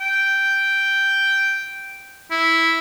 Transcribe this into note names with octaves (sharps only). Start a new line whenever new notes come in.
G5
E4